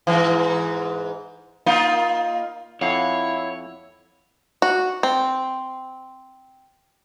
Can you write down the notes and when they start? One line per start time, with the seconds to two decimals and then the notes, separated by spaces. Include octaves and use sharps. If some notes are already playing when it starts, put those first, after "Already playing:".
0.07 G#2 E3
1.66 A#3 D#4 F4
2.81 F2 E4 C#5 F5 F#5
4.62 F#4
5.03 C4